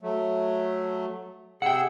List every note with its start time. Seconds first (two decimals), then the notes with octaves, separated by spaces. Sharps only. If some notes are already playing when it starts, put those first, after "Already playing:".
0.02 F#3 A3
1.62 C3 G#4 F#5 G5 E6